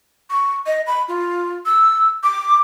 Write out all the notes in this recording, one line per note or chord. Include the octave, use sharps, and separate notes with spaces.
C#6
D#5
B5
F4
E6
D6